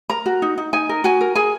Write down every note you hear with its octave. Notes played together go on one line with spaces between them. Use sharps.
A#4 A#5
F#4
D#4
D#4
D#4 G#5
A#4
F#4 G#5
A#4
G#4 G#5